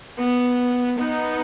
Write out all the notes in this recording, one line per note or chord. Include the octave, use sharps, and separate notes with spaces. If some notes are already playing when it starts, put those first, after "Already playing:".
B3
B3 D#4